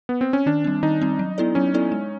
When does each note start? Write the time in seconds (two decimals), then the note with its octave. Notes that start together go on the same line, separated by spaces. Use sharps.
0.09 B3
0.21 C4
0.33 C#4
0.46 D#3 D4
0.64 G3 C4
0.83 D#3 D#4
1.02 G3 C4
1.19 F#3
1.38 B3 E4 A4 D5
1.55 F#3 C#4
1.74 B3 E4 A4 D5
1.92 G#3